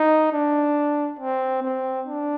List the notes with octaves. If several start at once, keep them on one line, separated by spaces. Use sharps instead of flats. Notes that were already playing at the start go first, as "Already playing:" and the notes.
Already playing: D#4
D4
C4
C4
D4